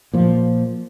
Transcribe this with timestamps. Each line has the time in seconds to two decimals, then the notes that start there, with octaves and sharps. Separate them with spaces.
0.14 A#2 F3